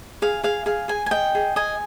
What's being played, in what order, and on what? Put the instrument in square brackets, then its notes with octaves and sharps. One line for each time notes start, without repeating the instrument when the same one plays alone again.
[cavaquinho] G#4 F5
G#4 F5
G#4 F5
G#4 G#5
G#5
D#5 G5
G#4
D#5 G#5